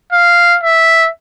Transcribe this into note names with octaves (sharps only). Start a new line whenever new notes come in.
F5
E5